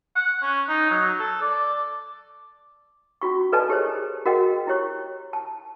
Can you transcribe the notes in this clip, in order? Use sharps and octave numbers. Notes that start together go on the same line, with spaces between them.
F#5
C#4
D#4
F#3
A4
D5
C#4 F4 F#4 C#6
A4 B4 D5 D#5 G#5 A5
E4 G4 G#4 A#4 C5 C#5
F#4 G#4 A#4 D#5 F#5 G5
E4 G4 C#5 C#6
A5